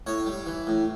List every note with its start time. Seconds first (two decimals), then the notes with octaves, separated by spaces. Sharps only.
0.07 A2 C#5
0.27 G3
0.47 E3
0.67 A2